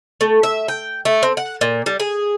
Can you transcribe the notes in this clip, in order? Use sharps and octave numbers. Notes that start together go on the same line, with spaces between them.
A3
E5
G5
A3
C4
F#5
A#2
G3
G#4